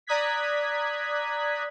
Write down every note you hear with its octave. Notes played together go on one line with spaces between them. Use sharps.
D5 A#5 D#6 F#6 G#6 B6